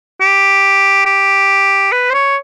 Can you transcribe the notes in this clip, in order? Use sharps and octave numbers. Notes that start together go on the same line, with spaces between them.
G4
G4
B4
C5
C#5